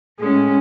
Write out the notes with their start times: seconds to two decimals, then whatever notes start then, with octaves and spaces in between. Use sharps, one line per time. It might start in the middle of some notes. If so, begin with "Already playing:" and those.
0.17 A2 G#3 C#4